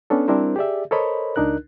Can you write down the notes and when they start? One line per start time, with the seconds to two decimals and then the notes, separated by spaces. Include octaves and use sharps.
0.10 B3 C#4 D4 A4
0.28 G3 C4 D4 E4 A#4 C5
0.56 G4 G#4 D5 E5
0.91 A4 A#4 C5 C#5 D#5 B5
1.36 C#2 D4 D#4 A#4 F#6